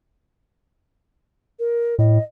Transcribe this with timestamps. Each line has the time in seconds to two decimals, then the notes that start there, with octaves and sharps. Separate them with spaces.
1.59 A#4
1.99 A2 D#5